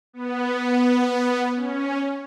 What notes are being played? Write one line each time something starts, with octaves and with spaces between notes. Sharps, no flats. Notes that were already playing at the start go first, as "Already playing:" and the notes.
B3
C#4